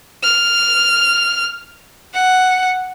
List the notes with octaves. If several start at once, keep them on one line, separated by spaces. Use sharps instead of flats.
F6
F#5